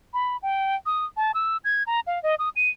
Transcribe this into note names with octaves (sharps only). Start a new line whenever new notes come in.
B5
G5
D#6
A5
E6
G#6
A#5
F5
D#5
D#6
D#7